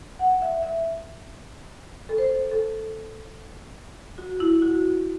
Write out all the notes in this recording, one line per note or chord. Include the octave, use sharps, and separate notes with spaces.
F#5
E5
E5
A4
C5
A4
F#4
E4
F#4